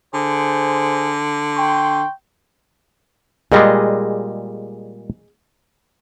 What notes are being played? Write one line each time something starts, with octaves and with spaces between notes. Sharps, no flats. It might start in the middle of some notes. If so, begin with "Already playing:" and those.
D3 G#4 C5
G5 C6 C#6
A#2 G3 G#3 G#4 D#5